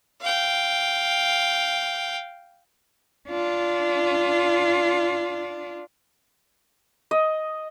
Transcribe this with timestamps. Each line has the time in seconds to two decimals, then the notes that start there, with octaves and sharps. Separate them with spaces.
0.21 F5 G5
3.28 D4 F4
7.11 D#5